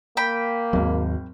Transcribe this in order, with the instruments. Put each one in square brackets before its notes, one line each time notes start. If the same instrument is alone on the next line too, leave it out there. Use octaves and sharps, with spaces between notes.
[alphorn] A#3 [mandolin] G5 B5
[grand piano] G#1 [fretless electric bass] D#2 F#3